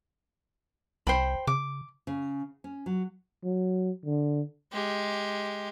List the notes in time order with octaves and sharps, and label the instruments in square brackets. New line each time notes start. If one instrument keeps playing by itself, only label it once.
[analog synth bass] C2 [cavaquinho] C5 G5 B5
[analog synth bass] C#3 [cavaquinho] D6
[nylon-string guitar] C#3
C#4
F#3
[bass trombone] F#3
D3
[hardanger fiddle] G#3 G4